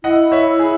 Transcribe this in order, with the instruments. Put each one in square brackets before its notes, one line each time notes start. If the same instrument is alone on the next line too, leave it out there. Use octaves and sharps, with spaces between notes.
[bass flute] E4 [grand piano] D#5 F#5
[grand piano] C#5 E5
G#4